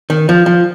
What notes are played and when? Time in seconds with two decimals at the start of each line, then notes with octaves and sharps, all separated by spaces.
0.10 D#3
0.29 F3
0.46 F3